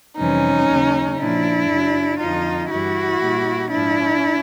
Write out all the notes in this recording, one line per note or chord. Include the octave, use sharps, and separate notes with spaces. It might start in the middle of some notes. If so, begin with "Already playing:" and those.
F2 C3 E3 G3 C#4 D#4
D#2 C#3 F#3
A#2 F3 D4 E4
F#2 C#3 F#3
F2 D3 F3 D#4 F4
G2 E3 G3 E4 F#4
A#2 G3
G#2 F3 D4 E4